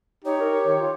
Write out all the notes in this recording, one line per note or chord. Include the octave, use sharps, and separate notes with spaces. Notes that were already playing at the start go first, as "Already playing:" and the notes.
D#4 G4 C#5
A#4
D#3
F4